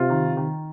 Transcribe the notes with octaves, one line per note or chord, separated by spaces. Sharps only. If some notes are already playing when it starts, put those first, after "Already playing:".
Already playing: C3 F4
D#3
D#3